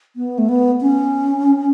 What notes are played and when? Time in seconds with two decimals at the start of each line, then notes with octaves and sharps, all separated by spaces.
0.16 B3
0.38 A3
0.49 B3
0.81 C#4